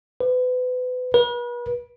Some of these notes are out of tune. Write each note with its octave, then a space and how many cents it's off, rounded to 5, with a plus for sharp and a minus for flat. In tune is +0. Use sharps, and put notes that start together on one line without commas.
B4 +30
B4 -40